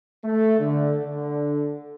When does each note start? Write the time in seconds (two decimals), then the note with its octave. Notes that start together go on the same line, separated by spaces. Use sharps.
0.24 A3
0.59 D3
1.02 D3